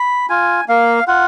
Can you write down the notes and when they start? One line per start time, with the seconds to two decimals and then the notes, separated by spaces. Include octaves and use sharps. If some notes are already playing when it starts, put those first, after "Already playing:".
Already playing: B5
0.30 F4 G#5
0.69 A#3 F5
1.08 F4 F#5